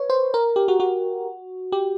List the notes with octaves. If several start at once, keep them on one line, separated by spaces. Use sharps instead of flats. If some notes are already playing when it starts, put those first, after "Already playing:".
Already playing: B4 C#5
C5
A#4
G4
F#4
F#4
G4